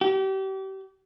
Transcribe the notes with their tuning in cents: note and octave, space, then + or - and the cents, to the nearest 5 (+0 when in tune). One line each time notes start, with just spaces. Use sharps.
G4 -35